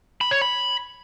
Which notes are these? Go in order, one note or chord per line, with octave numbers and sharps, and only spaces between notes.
B5
C#5
B5